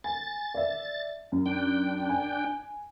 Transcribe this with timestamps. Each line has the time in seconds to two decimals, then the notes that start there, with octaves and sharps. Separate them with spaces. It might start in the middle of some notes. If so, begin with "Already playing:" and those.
0.04 G#5 A6
0.54 D5 E5
1.32 F#2
1.46 D4 G5
2.09 G#5